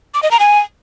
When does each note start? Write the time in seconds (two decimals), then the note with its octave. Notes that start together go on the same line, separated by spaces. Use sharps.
0.14 D6
0.23 D#5
0.31 A#5
0.39 G#5